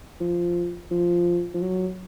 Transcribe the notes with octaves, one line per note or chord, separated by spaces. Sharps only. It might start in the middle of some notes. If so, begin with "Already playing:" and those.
F3
F3
F3
F#3